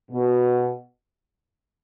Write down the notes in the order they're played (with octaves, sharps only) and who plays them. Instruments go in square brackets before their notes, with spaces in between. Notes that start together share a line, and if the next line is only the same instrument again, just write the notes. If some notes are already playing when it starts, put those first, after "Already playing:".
[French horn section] B2